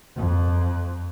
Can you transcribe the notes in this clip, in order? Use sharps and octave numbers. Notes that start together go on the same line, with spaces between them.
F2